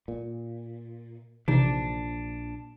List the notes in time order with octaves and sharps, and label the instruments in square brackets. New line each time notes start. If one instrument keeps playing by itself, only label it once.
[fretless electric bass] A#2
[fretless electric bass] A#1 [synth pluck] C3 E3 D#4 [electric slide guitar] D4